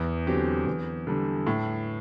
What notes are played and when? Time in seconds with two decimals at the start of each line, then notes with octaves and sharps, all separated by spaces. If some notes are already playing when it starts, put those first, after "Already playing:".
Already playing: E2
0.27 D3 F#3 C4 G4
0.67 E2
1.07 D3 G3
1.47 A2